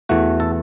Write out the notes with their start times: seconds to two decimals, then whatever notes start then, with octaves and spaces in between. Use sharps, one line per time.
0.09 E2 E3 A3 F#4
0.40 A4